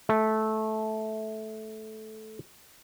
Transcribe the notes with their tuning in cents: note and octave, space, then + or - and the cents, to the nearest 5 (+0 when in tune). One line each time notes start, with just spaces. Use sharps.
A3 -15